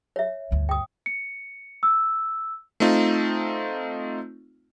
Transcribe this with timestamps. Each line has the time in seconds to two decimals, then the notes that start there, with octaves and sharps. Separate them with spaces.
0.16 C#5 E5
0.51 D2 G2
0.69 G5 D#6
1.06 C#7
1.83 E6
2.80 A3 C4 D#4 F4